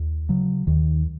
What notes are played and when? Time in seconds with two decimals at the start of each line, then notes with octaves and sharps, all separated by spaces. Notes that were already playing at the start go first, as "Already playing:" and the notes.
Already playing: D#2
0.29 C#3 F#3
0.67 D#2 D#3